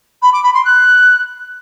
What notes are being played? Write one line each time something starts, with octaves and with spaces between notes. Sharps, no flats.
B5
D6
B5
C6
F#6